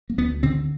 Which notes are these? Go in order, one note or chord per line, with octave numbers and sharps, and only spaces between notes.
A#3
D2 B3
D3 C4